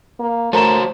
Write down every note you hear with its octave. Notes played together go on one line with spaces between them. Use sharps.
A#3
A3 F#4 A#4 C5 C#5 A5 A#5 E7